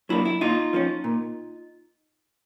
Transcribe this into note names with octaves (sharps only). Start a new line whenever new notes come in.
F#3 A#3 D4 E4
E4
A#2 D#4 F4
F3 A#3 C#4
A#2